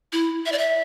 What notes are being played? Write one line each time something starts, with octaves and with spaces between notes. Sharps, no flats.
E4
E5
D5
E5